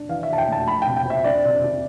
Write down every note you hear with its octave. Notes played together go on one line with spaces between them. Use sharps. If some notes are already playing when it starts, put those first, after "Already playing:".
Already playing: D4
E3 F5
E5
E3 A5
G5
A3 A5
F3 B5
G5
C3
G5
C4 E5
D4 D5
C3
D4